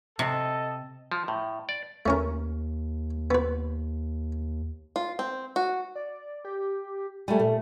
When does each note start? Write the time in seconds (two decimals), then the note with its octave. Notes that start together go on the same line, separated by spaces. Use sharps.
0.19 C3 A4 D#5
1.12 F3
1.28 A2
1.69 D5
2.06 D#2 A3 C#4 A#4
3.31 B3 B4
4.96 F4
5.19 C4
5.56 F#4
5.95 D5
6.45 G4
7.28 G3 A3 G#5
7.39 A#2 A3